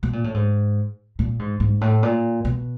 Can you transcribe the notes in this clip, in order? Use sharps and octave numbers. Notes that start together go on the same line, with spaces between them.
B2
A#2
A2
G#2
A#2
G#2
G#2
A2
A#2
B2